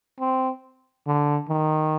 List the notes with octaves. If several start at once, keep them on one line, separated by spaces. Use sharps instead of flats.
C4
D3
D#3